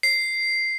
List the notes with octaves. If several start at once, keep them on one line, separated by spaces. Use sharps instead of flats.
C7